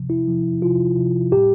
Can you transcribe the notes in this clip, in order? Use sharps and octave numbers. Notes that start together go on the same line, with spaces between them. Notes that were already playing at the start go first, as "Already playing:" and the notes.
Already playing: C3 F3
E4
C3 F3
C3 F3 F4
C3 F3
A2 G3 G4